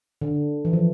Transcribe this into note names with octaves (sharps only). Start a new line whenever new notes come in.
D3
E3
F3